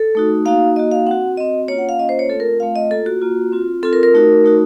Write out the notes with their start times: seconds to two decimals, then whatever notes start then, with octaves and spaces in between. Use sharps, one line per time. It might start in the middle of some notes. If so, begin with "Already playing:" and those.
Already playing: A4
0.15 A3 D#4 F#4
0.45 A#3 D#4 F#4 F5
0.76 A#3 D#4 F#4 D#5
0.91 F5
1.06 C4 F#4 F#5
1.37 C4 F#4 D#5
1.68 A#3 C#4 F4 C#5
1.78 F#5
1.89 F5
1.99 A#3 C#4 F4 D#5
2.09 C5
2.19 C#5
2.29 A3 C4 F4 A4
2.40 A#4
2.60 A3 C4 F4 F5
2.76 D#5
2.91 A#3 F4 A4
3.06 F#4
3.22 A#3 F4
3.52 C4 F4
3.83 C4 F4 A4
3.93 A#4
4.03 A#4
4.14 A3 D#4 F#4
4.44 A3 D#4 F#4